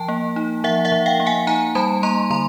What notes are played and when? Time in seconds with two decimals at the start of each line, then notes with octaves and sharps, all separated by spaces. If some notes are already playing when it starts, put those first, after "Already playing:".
Already playing: F3 G5 A5
0.08 A#3
0.36 D#4
0.64 F3 E5 F#5
0.85 E5 F#5
0.92 F3
1.06 F5 G5
1.20 A#3
1.26 F#5 G#5
1.47 D#4 G#5 A#5
1.75 G3 A5 B5
2.03 A#3 A#5 C6
2.30 D3 A#5 C6